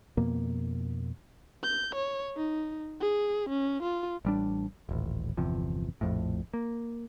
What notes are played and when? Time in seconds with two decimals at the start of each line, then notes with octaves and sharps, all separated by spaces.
0.17 F2 B2 A#3
1.63 G6
1.95 C#5
2.37 D#4
3.01 G#4
3.50 C#4
3.83 F4
4.25 A1 G3 D4
4.89 D#1 A1
5.37 G1 E2 C3 F3
6.01 A#1 F2 A2
6.54 A#3